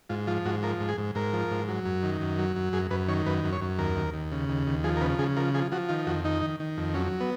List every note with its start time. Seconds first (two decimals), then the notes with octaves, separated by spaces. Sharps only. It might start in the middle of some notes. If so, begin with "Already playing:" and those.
0.10 G#2 F4
0.27 F3 F4
0.45 G#2 F#4
0.62 F3 A#4
0.80 G#2
0.89 G#4
0.98 G#2
1.15 G#2 A#4
1.33 F3
1.51 G#2
1.68 F#3
1.85 F#2
2.03 D#3
2.21 F#2
2.39 F#3
2.56 F#2
2.73 F#2 G#4
2.91 F#2 B4
3.08 D#3 C#5
3.26 F#2 B4
3.44 F#2
3.53 C#5
3.61 F#2
3.78 D#2 A#4
3.96 D#2
4.14 D#2
4.32 C#3
4.49 D#2
4.67 D#2
4.84 F3 G#4
4.97 A#4
5.01 C#3 B4
5.19 C#3 G#4
5.37 F3 A#4
5.54 F3 G#4
5.72 F3 F#4
5.89 D#3 F4
6.07 F2 F#4
6.24 D#3 D#4
6.42 D#3
6.60 D#3
6.77 F2
6.94 F#3 C#4
7.21 B3